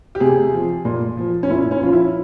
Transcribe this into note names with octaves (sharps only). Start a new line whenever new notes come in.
G4
C3 G#4
F3
A#2
F3
C#4
A#2 E4
C#4
F3 F4
E4